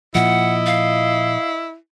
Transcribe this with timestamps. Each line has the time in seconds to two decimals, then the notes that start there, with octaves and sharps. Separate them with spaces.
0.15 A#2 F3 E4 D#5 F#5
0.66 F5